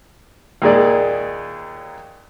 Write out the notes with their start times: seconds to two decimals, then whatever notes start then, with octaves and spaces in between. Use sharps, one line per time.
0.62 D#2 A#2 G#3 D5